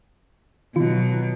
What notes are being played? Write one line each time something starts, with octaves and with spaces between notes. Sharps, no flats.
B2 D#3 F#3 F4